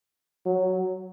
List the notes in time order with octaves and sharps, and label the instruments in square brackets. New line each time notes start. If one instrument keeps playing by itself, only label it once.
[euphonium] F#3